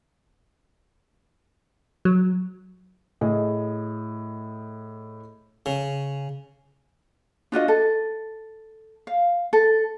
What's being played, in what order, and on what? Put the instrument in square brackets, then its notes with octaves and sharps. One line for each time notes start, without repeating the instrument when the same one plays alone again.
[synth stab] F#3
[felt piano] A2 G#4 D#5
[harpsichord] C#3
[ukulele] D4 F4 F#4 D#5
A4
F5
A4